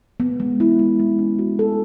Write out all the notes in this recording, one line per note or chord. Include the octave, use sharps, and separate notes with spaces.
B3
G#3
E4
G#3
G#3
C#4
F#4
A4